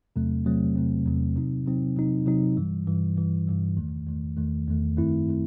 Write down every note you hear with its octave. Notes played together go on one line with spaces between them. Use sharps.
E2 C3 F#3 A3 C4
E2 C3 F#3 A3 C4
E2 C3 F#3 A3 C4
E2 C3 F#3 A3 C4
C3 F#3 C4 D#4
C3 F#3 C4 D#4
C3 F#3 C4 D#4
C3 F#3 C4 D#4
G2 E3 G3
G2 E3 G3
G2 E3 G3
G2 E3 G3
E2 D#3 A3
E2 D#3 A3
E2 D#3 A3
E2 D#3 A3
F#2 D#3 A3 C4 E4
D#3 A3 C4